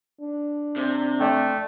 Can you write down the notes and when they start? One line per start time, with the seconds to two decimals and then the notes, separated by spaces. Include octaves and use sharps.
0.21 D4
0.76 C3
1.20 A3 D5 G5